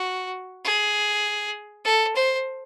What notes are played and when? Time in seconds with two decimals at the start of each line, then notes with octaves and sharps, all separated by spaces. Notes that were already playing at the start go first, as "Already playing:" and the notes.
Already playing: F#4
0.65 G#4
1.85 A4
2.15 C5